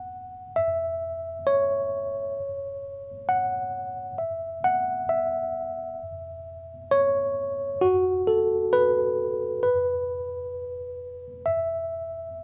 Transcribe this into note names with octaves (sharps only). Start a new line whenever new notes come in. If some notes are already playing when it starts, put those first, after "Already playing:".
Already playing: F#5
E5
C#5
F#5
E5
F#5
E5
C#5
F#4
A4
B4
B4
E5